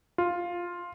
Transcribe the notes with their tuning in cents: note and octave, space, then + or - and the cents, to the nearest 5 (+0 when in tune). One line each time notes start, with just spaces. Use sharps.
F4 +5